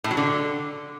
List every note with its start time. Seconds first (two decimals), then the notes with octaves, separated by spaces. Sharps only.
0.04 A2
0.11 F#3
0.17 D3